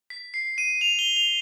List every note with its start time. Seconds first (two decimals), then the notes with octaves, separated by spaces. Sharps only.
0.10 B6
0.34 C7
0.58 D#7
0.81 F7
0.99 G7
1.16 F7